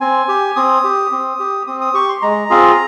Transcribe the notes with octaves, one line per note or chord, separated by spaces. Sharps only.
C4 G#5
G4
C4 D#6
G4
C4
G4
C4 D#6
D#6
G4 C#6
C6
G#3 A#5
C4 F4 G#4